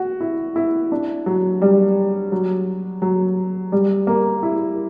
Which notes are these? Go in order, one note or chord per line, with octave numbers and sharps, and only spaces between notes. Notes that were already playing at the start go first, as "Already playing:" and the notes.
Already playing: F#4
E4
E4
D4
F#3
G3
F#3
F#3
G3
A#3
E4